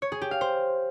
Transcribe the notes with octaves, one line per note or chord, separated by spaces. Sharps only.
C#5
G#4
G4
F5
C5